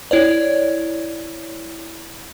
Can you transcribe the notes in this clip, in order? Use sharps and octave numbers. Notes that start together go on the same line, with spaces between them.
E4 C#5 D5